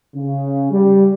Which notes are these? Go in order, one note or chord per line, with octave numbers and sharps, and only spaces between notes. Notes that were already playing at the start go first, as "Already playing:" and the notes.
C#3
G3